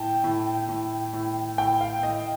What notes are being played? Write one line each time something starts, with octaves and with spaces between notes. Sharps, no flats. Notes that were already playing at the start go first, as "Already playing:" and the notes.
Already playing: A2 G5 A5
A2
A2
A2
A2 G5
F5
A2 D#5